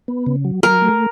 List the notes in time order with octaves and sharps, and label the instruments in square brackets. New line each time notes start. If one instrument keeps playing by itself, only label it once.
[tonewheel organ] B3
C#3
F#3
[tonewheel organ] F#3 [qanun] A#4
[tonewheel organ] A3